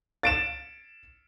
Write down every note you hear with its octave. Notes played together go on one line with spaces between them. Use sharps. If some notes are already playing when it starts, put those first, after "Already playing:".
A6 D7 E7